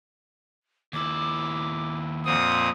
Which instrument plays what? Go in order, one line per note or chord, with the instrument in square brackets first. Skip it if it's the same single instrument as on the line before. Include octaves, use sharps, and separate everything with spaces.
[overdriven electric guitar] D#2 E4 [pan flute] D6
[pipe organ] F2 A#2 C4 [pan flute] F#5 [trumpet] D#6